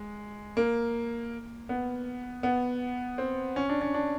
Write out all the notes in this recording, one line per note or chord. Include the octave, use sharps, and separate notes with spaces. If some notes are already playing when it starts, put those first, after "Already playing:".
Already playing: G#3
A#3
B3
B3
C4
C#4
D4
C#4
D4